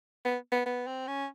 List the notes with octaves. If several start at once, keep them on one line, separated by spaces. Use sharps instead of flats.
B3
B3
B3
C4
C#4